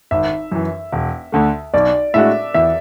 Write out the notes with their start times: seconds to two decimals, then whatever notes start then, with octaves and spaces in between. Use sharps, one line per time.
0.11 G#1 E5
0.52 F#2 E3
0.93 E1
1.32 D2 D3 A3
1.74 B1 D5
2.14 A2 G#3 D4 F#4 E5
2.54 E2 E5